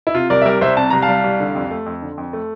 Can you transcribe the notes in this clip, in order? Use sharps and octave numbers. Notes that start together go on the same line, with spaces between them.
E4
C3 F4
C2 A#4 D5
E5
G3 A#4 D5
C2 C5 E5
C3 A5
C2 A#5
F5 A5
G3
C2
D3
F2
A3
F2
D3
F2
A3